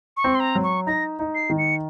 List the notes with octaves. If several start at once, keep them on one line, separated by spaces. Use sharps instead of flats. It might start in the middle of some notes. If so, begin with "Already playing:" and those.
C#6
C4
C6
A#5
F#3
C#6
D#4 A#6
D#4
C7
D#3
C#7